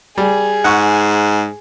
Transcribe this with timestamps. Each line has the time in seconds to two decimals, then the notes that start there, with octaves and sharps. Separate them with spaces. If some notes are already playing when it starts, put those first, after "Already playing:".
0.18 G3 G#4
0.64 G#2 F#5 C#6